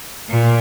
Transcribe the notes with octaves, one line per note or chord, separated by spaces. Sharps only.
A#2